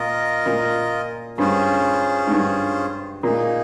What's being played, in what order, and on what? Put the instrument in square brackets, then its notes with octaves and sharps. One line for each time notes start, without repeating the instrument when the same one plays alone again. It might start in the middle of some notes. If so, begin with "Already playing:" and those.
Already playing: [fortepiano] A#2 [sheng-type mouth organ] F4 A#4 D#5
[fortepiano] A#2
[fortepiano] G2 [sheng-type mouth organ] C#4 F4 G#4 C5
[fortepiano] G#2
G2
[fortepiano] A#2 [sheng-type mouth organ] A#3 D#4 G#4